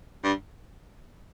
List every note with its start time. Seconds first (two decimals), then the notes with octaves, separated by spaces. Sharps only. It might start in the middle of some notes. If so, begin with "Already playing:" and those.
0.24 G2